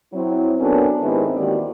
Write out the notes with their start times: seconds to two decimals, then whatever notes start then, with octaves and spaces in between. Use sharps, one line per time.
0.14 F#3 C4 E4
0.59 B3 C#4 D4 F#4 A4 A#4
1.02 G#2 D#3 C4 E4 G4 B4
1.36 D#2 D#3 E3 F#4 G4 D5